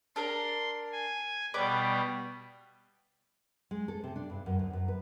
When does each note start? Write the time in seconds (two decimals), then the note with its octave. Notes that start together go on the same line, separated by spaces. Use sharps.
0.16 D4 A#4 C6
0.92 G#5
1.54 B2 G3 B4 D5
3.71 G#3
3.88 A4
4.04 C3
4.16 D4
4.30 G2
4.46 F#2
4.59 D2
4.73 F#2
4.88 B4